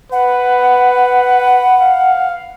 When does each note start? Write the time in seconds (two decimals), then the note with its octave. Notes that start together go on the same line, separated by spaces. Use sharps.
0.12 B4 F#5
1.81 F5